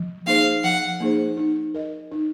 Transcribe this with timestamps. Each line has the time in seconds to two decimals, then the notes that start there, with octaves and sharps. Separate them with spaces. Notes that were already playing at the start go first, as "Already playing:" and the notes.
Already playing: F3
0.26 A#3 D#4 G#4 C5 F5
0.64 F3 F#5
1.00 A#3 D#4 G#4 C5
1.37 D#4
1.74 A#4 D#5
2.12 D#4